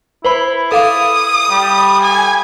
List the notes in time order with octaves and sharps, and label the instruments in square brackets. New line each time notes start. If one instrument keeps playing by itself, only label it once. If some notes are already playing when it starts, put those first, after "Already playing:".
[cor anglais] E4 [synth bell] B4 C5 B5
[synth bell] A4 F5 D6 [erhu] D#6
[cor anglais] G3
[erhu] G#5